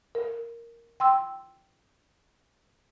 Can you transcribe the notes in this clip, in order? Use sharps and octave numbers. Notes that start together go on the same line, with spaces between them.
A#4
G5 C6 E6